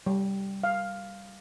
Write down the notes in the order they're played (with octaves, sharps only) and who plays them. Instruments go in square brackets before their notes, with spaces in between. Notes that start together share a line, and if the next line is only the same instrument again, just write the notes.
[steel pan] G3
F5